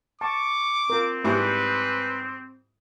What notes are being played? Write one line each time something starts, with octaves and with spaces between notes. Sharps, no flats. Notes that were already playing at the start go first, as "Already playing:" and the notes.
A5 C#6 D6
C4 F4 A#4
G#2 G3 E4 B4 B5 C#6